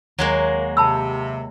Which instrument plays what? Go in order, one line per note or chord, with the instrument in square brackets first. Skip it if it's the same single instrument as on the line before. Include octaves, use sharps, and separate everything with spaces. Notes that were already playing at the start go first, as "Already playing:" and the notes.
[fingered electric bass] D#2 [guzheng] F#3 G#3 A#3
[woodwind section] C3 [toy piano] A5 B5 E6